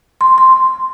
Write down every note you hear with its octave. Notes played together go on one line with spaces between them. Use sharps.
C6
C6